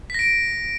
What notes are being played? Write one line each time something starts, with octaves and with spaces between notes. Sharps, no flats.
A#6 B6 D7